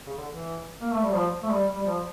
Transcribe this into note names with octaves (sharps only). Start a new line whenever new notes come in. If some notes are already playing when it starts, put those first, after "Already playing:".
C#3
D3
E3
A#3
A3
G3
F3
A3
G3
G3
F3